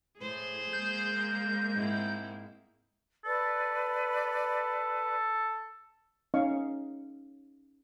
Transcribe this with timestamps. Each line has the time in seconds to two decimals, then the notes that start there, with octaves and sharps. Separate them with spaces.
0.20 A2 G#4 C5
0.73 G#3 A#3 G6
1.75 G#2 C4 E4
3.25 A4 B4 D5
6.34 C#4 D#4 D#5 F5 C#6